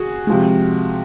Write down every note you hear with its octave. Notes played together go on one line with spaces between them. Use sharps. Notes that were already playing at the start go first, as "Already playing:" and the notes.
Already playing: F#4 G#4
C3 F3 G#3